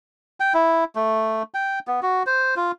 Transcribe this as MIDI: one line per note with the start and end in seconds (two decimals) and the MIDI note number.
0.40 0.53 79
0.54 0.84 64
0.95 1.43 57
1.54 1.79 79
1.87 2.00 59
2.02 2.23 66
2.26 2.55 72
2.56 2.72 65